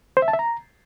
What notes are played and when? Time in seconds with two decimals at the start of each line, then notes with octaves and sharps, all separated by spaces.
0.17 C5
0.22 E5
0.28 A5
0.33 E5
0.39 A#5